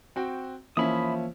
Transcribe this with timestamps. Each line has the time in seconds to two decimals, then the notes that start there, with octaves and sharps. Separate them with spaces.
0.16 C4 F#4 G5
0.77 E3 F3 A#3 C#4 E4 E5 B5 D#6